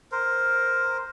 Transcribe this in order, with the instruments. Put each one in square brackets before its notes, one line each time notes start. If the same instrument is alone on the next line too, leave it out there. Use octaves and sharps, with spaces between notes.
[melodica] A#4 C5